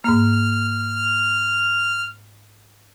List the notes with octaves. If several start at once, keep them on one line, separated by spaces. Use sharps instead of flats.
G#2 A#3 F6